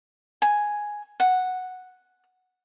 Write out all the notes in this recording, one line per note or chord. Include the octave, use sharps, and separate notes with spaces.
G#5
F#5